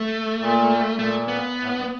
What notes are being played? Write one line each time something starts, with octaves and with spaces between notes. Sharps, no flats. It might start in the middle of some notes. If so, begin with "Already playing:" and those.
Already playing: A3
A#2
A#2 A3
B3
A2
G2